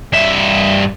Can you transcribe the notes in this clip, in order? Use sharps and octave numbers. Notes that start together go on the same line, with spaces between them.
G2 E5